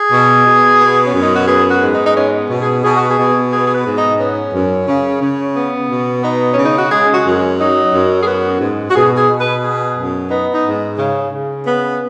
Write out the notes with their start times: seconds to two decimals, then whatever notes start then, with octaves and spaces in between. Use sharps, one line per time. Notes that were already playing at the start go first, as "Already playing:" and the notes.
Already playing: G#4
0.11 B2
0.46 B2
0.80 B3
1.07 C#4
1.13 F#2
1.21 D#4
1.34 F#4
1.48 B3 G#4
1.70 F#4
1.81 G#2
1.93 D#4
2.06 D#4
2.16 B3 C#4
2.50 B2
2.62 G#4
2.84 B2 G#4
2.97 F#4
3.10 G#4
3.18 B2
3.52 B3 G#4
3.66 G#4
3.75 B4
3.86 G#2
3.98 D#4
4.19 B3 C#4
4.53 F#2
4.87 C#3
5.22 C#3
5.56 B3
5.90 B2
6.24 B3 D#4
6.53 C#3 C#4
6.65 D#4
6.78 F#4
6.91 G#3 G#4
7.14 F#4
7.26 F#2
7.37 C#4
7.59 F#3 D#4
7.94 F#2
8.22 G#4
8.27 B3 F#4
8.61 G#2
8.90 F#4
8.95 B2 G#4
9.17 G#4
9.29 B2
9.40 B4
9.63 B3 G#4
9.97 F#2
10.31 B3 D#4
10.54 D#4
10.65 G#2
10.99 C#3
11.33 C#3
11.67 B3